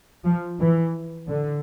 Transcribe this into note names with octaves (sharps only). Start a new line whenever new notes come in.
F3
E3
D3